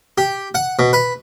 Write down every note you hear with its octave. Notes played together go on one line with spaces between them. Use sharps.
G4
F#5
B2
B4